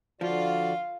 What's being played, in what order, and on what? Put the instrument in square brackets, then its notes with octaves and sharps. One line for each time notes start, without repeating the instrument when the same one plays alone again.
[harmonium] D3 F#4 D5 [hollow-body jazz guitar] F3 [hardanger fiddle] F4 F5